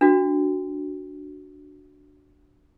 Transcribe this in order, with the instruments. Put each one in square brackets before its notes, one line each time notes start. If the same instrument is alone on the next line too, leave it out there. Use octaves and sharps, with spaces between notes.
[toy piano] D4 F#4